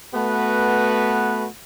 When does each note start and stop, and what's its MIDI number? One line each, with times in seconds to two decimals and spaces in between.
0.14 1.46 57
0.14 1.46 59
0.14 1.46 66
0.14 1.46 71